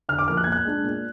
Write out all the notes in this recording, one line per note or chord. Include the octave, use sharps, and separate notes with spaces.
D3 F6
D6
F3 A#3 F6
F#6
G#6
A#2
F#6
G#3 D4
A#2